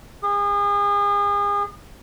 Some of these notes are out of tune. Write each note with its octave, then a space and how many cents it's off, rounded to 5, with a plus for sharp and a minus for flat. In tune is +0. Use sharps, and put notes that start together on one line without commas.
G#4 -35